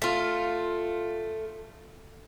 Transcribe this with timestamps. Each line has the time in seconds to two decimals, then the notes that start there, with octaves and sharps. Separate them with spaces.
0.02 A3 F4